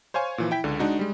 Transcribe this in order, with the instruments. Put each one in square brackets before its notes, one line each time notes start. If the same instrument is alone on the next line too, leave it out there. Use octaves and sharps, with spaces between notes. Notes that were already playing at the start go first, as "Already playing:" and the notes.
[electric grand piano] C5 C#5 F5 G#5 C#6
A#2 E3 F3
E4 G5 B6
C#2 D3
G#3 D4 D#4 F#4
G3 G#3